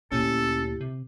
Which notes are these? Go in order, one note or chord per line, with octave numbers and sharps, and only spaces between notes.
D2 A#2 C#4 E4 G4 A4
C3